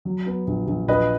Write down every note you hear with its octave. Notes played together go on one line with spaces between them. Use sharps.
F#3
B3
A#1
A#1
A#1 B4 D#5